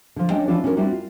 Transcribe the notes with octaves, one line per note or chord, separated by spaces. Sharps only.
D3 F3
C#4 D4 C#5 D#5 G5
E3 F3 C#4 D4 F4 D5
C#4 D4 F#4 G4 A#4
G3 C4 D4 E4 F#4
F4